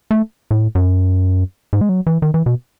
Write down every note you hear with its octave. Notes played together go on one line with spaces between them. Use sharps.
A3
A2
F#2
G#2
G#3
F#3
E3
D#3
E3
B2